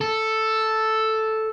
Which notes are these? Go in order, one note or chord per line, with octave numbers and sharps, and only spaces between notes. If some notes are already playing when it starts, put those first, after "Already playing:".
A4